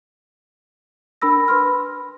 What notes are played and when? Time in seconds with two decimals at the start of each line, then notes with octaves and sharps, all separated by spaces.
1.22 D4 A#4 B5 E6 A#6
1.48 B4 B5 C6 F6